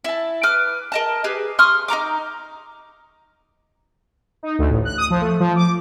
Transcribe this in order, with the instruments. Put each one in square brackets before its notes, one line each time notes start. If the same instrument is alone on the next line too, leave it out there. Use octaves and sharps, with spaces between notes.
[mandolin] E4 A5
B4 D6 F6
A#4 D#5 A5
G4 G#4 B4
C6 C#6 D#6 F6
D#4 F#4 A#5 D6
[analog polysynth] D#4
D2
A1
F#6
D#6
F3
A3
F3
D6